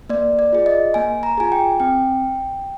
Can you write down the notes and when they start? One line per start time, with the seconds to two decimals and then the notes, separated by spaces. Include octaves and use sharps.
0.09 A#3 D5
0.39 D5
0.53 F4 G#4
0.66 D#5
0.94 A#3 G#5
1.23 A#5
1.37 F4 G#4 G#5
1.52 G5
1.80 C4 G5